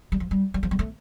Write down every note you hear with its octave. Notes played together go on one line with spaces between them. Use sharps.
G3
F3
G3
G3
F3
G3
A3